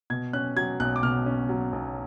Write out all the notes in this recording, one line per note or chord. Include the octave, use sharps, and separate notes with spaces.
B2 G#6
C#4 F#6
F#3 G#6
B1 F#6
D6
B2 F6
C#4
F#3
B1